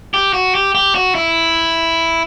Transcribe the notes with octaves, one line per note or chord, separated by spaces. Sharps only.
G4
F#4
G4
G4
F#4
E4